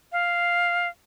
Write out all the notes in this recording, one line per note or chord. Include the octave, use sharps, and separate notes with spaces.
F5